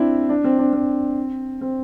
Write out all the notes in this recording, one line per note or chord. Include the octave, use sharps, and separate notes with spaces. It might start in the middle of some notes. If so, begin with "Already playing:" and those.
Already playing: C4 D4 E4
D4
C4
D4
C4
C4